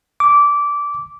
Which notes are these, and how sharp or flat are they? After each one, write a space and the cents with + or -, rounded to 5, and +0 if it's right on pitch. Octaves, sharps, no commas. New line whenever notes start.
D6 -15